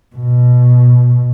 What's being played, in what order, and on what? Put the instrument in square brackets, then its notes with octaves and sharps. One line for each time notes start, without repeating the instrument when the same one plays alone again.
[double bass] B2